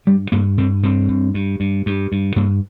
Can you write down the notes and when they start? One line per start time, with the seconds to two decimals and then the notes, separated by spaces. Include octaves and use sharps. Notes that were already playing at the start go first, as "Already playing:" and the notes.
0.07 G2 G3
0.32 G2 A#3
0.58 G2 C4
0.83 G2 C4
1.09 G2
1.34 G2
1.60 G2
1.86 G2
2.12 G2
2.36 G2 A#3